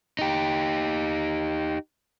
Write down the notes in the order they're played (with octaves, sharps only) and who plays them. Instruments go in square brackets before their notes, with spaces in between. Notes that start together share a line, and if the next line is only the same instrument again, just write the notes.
[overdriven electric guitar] D#4 G4